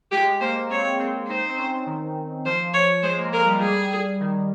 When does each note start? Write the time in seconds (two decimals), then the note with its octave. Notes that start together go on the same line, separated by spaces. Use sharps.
0.11 G#3 G4
0.41 A#3 C5
0.70 C4 C#5
0.99 C4
1.28 D#4 C5
1.49 C4
1.58 C#4
1.86 D#3
2.45 F3 C5
2.74 C#5
3.03 G#3 C5
3.18 A#3
3.33 G#3 A#4
3.47 G3
3.61 G#4
4.20 D#3